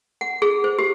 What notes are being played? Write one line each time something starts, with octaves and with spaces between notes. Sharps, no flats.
F#5
G#4
C5
G4